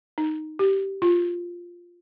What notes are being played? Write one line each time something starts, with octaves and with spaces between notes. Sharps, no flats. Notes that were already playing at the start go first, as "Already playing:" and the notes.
D#4
G4
F4